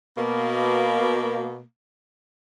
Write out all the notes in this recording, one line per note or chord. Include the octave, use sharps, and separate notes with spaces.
B2 A#3